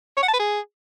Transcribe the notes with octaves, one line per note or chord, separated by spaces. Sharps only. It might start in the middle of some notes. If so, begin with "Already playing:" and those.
C#5
F#5
A5
B4
G#4